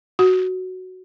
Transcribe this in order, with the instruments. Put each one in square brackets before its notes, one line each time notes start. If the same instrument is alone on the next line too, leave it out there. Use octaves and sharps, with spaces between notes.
[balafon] F#4